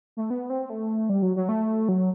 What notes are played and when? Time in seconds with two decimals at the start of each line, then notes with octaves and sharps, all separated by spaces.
0.17 A3
0.30 B3
0.50 C4
0.70 A3
1.09 G3
1.22 F#3
1.36 F#3
1.49 A3
1.89 F#3